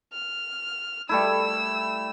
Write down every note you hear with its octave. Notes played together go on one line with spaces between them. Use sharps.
F6
G3 A3 E4 E6